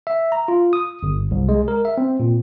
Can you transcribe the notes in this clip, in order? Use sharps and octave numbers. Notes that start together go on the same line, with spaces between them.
E5
A#5
F4
D#6
G1
C2
G#3
A#4
E5
C4
A#2